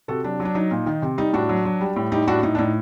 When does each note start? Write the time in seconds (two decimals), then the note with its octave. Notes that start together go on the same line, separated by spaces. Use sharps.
0.08 C3 F#4 A4
0.24 F#3 D4
0.40 F#3
0.45 D4
0.55 F#3 D#4
0.71 A#2
0.86 D#3
1.02 C3
1.18 G3 D#4
1.33 A2 D4 F#4
1.49 F#3
1.65 F#3
1.81 G3
1.96 A2
2.12 G3 D#4 G4
2.27 A2 D4 F#4
2.43 A2 D#4
2.55 D4
2.59 A2 D#4